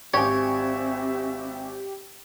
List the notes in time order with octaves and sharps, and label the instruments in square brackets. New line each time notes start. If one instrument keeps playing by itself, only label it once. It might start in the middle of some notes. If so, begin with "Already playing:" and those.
[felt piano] G#1 G#5 [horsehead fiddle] C4 E5 [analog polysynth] G4 [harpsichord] C#5